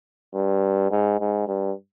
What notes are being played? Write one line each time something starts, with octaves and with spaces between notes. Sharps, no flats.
G2
G#2
G#2
G2